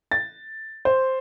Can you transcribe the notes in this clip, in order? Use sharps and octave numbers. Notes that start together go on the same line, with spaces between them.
A6
C5